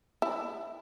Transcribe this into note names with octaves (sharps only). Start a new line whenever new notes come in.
E4